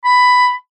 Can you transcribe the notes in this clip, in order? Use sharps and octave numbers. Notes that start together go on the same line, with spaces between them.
B5